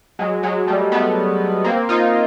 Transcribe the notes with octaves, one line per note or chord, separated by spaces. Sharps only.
F#3 G#3
F#3 G#3
G3 A3
A3 B3
A#3 C4
D#4 F4